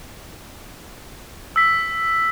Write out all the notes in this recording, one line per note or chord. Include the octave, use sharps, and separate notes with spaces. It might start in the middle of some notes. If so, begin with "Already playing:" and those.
E6 B6